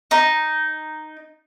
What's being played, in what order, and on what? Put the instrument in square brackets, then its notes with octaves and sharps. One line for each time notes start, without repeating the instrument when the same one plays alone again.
[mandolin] D#4